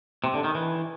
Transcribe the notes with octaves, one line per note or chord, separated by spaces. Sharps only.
C3
D3
D#3
E3